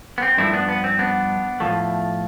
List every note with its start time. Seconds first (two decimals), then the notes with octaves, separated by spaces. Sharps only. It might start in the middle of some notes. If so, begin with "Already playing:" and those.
0.18 B3
0.22 C4
0.38 G2 F3 A3 C4 E4
0.53 B3 D4
0.69 B3
0.84 C4
0.99 B3 D4
1.60 A2 F3 A3